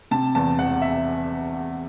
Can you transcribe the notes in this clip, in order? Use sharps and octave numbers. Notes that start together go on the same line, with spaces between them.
C3 A5
E2 A5
E1 F#5
E5